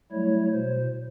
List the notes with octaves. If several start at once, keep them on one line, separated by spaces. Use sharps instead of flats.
F#3 G3 A3 E4 C#5
B2 C5